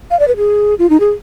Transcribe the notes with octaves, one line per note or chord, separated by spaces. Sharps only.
F5
D5
B4
G#4
F4
D#4
G#4